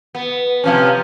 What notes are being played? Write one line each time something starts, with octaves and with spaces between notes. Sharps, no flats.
B3
C3 F3 C#4